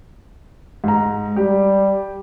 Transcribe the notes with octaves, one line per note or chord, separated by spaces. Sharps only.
G#2 A#5
G3 G4